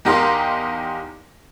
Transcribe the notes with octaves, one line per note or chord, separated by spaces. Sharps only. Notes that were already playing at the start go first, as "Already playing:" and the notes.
E2 D#4 G4 A#4 F5 C6